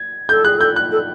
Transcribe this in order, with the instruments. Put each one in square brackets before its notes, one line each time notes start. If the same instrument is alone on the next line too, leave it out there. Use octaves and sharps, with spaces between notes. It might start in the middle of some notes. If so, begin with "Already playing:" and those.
Already playing: [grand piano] G#6
[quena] A4 [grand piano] G6
[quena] G#4 [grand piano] F#6
[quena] A4 [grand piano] G6
[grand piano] F#6
[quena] A4